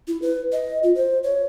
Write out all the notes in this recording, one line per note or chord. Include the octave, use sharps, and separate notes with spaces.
E4
B4
D#5
F4
C5
C#5